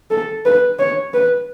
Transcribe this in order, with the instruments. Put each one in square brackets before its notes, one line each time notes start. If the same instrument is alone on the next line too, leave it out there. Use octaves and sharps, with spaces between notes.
[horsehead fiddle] A4
B4
C#5
B4